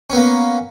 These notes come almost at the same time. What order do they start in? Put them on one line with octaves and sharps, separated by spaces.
C#4 B3 A#3